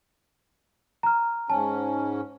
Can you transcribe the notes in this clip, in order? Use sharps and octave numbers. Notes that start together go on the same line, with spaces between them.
A#5 F6
G#2 C#4 A5